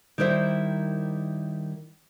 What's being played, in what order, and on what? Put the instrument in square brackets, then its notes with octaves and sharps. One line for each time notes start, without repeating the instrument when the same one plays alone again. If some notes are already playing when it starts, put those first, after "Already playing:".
[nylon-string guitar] D#3 G3 E4 A#4 C5 E5